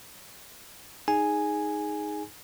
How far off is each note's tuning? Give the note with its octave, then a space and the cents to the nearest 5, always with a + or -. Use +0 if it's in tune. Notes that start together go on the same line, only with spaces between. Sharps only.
D#4 +0 G#4 +0 G#5 +0